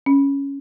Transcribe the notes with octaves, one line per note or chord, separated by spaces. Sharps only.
C#4